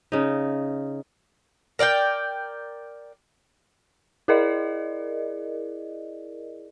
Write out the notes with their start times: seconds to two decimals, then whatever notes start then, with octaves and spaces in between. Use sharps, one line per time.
0.12 C#3 D#4
1.79 A#4 D5 F#5 G5
4.28 E4 G#4 A#4 D5 D#5